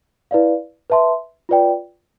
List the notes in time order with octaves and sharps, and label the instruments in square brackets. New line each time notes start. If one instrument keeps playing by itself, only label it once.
[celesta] E4 B4 D5 F5
B4 E5 A5 C6
F4 B4 D5 G5